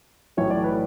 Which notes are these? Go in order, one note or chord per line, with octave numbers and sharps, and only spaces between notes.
B1 A2 E3 C#5
D5
B4